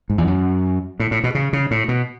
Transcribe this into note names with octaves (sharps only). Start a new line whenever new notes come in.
G#2
E2
F#2
A2
A2
B2
C#3
C#3
A2
B2